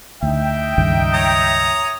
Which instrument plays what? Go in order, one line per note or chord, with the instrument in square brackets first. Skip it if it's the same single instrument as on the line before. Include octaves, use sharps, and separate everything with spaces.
[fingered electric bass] D2 [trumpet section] D#4 G5 [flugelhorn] E5
[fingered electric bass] C#2 G2 D#3
[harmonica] C#5 A#5 D#6